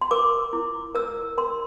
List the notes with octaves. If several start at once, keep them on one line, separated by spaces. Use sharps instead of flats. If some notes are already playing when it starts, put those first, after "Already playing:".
C6
A#4 D6
E4
A#4 E6
A#4 C6